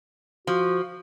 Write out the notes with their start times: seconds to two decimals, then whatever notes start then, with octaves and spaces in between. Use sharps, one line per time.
0.47 F3 F#4